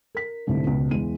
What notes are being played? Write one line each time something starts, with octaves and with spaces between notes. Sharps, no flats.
A#4 B6
C2 G#2 D3 A3
C#2 B2
E2 G#3 D#7